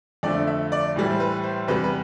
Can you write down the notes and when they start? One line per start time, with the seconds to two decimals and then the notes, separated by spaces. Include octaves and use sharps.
0.23 F2 D3 F3 A3 D5
0.47 E5
0.72 D5
0.96 A2 E3 G3
1.10 C5
1.20 B4
1.44 C5
1.68 E2 C3 G3 B4
1.84 B4